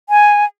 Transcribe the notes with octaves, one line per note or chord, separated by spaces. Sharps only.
G#5